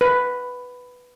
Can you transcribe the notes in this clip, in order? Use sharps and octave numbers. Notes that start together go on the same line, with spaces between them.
B4